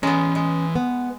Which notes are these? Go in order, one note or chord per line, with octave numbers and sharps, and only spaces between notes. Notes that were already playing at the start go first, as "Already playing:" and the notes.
E3 G#3 B3 C#4 A#5
G#3
B3